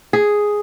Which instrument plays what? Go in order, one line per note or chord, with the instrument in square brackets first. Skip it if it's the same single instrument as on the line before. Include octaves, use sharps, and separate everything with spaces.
[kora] G#4